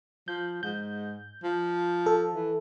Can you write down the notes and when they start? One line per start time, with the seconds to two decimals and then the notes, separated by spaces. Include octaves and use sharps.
0.28 F3 G6
0.63 G#2 G6
1.44 F3
2.06 A4
2.34 E3